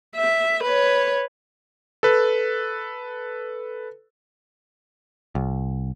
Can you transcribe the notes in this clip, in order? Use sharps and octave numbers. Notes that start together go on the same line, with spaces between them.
E5
B4 C#5
A4 B4
C2